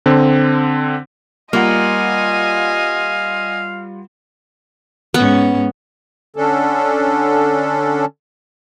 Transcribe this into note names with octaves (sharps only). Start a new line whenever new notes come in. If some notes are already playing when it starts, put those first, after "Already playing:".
D3 C4
G3 A#3 F4 D#5 F5 F#5 G#5
G#2 B3 C#4
D3 C#4 D4 A4